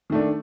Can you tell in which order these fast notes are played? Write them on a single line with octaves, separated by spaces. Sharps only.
D#3 A3 D4